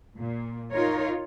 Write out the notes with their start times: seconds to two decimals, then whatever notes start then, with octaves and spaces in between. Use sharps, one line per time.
0.16 A#2
0.71 D#4 F4 A#4 C#5